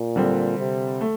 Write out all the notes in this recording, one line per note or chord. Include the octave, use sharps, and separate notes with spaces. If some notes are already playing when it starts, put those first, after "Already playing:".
Already playing: A#2
D3 G3 C4
C3
A3